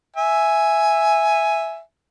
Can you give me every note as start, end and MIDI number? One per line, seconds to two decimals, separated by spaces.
0.16 1.80 76
0.16 1.80 80